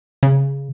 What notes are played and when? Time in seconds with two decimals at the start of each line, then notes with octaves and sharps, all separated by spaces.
0.23 C#3